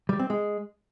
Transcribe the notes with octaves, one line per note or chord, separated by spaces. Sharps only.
G3
C4
G#3